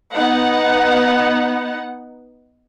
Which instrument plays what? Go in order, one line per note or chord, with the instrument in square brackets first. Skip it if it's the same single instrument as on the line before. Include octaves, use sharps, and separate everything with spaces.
[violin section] B3 D#4 F#5